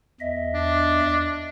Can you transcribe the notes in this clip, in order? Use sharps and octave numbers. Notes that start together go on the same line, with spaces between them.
E2 D#5 E5
D4